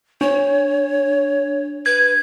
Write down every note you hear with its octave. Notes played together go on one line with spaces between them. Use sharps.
D4 C#5
B4 G#6